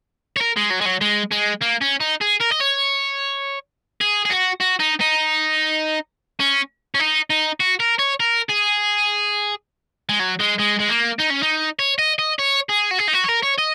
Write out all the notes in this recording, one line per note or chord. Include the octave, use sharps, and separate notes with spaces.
C#5
A#4
G#3
F#3
G#3
F#3
G#3
G#3
A#3
C#4
D#4
G#4
A#4
D#5
C#5
G#4
G#4
F#4
F#4
D#4
D#4
C#4
C#4
D#4
D#4
F#4
A#4
C#5
A#4
G#4
G#3
F#3
G#3
G#3
G#3
A#3
D#4
C#4
D#4
C#5
D#5
D#5
C#5
G#4
F#4
G#4
D#4
F#4
C#5
A#4
C#5
D#5